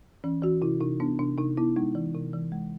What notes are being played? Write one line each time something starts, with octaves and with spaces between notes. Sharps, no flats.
E3 C#4
E3 F#4
C3 E4
C3 D#4
B3 D4
C3 D4
C3 D#4
B3 E4
G#3 D#4
E3
C3
E3
G#3